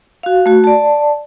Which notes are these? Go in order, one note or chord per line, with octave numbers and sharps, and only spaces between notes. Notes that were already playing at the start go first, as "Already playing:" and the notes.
F#4 F5
A3 F#4
D5 A5